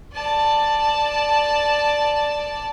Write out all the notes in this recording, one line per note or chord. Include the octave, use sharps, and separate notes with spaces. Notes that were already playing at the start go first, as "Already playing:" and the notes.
D5 A5